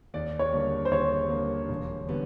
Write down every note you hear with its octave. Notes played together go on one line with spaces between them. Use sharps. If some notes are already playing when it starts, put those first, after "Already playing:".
D#2 D5
C#5
D3 G3 A#3
C5
D#2 C#5
D3 G3 A#3
E1
D3 G3 B3